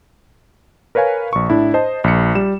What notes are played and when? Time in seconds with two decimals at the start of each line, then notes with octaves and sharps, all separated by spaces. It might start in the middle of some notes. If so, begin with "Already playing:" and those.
0.95 A#4 B4 C#5 F5 G#5
1.33 A#1 C#6
1.50 A2 D4 E4
1.74 C5 D#5 A5
2.04 A#1 C#7
2.35 G3 E7